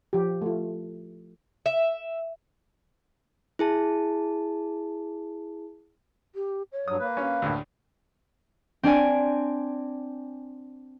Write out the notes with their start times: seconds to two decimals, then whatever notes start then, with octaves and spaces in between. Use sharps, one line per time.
0.13 F3 G4
0.42 A3 F4
1.66 E5
3.59 E4 G#4 A5
6.35 G4
6.72 C#5
6.88 G2 F#3 D#6
7.00 A#3 B4
7.17 C#4 F5
7.42 D2 A2
8.83 C4 D4 D5 G#5